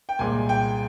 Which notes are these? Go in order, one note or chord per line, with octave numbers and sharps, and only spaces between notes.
G5
C2 A#2 G#3 G#5
G5